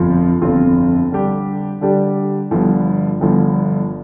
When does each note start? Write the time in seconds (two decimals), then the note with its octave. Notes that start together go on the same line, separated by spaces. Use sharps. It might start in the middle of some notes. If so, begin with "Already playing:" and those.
Already playing: G1 F2 F3 C4 F4
0.41 G1 F2 F3 C4 F4
1.12 D3 G3 D4 G4
1.81 D3 G3 D4 G4
2.51 G1 G2 D3 F3
3.21 G1 G2 D3 F3